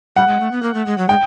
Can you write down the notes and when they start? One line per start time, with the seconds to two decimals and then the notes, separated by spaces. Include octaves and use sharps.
0.16 G3 F#5
0.27 G#3
0.40 A3
0.52 B3
0.62 A#3
0.74 A3
0.86 G#3
0.98 F#3
1.09 G#3 G5